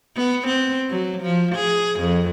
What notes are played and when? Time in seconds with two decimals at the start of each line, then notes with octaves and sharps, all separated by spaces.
0.16 B3
0.47 C4
0.90 F#3
1.23 F3
1.55 G#4
2.00 F2